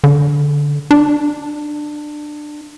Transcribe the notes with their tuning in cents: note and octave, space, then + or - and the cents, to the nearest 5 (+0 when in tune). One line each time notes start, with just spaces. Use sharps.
D3 -10
D4 +20